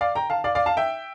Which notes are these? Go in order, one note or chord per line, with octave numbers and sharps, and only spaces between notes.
D5 F5
G5 A#5
F5 A5
D5 F5
D5 F5
F5 A5
E5 G5